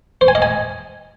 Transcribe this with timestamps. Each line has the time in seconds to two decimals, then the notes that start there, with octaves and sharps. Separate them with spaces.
0.21 C5
0.28 G#5
0.35 D#5
0.42 G#5